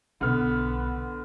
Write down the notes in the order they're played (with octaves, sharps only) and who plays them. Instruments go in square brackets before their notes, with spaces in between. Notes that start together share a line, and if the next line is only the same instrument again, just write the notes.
[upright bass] B1 [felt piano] D3 F6 [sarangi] B3